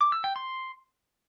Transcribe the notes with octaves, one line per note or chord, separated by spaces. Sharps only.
D6
E6
G5
C6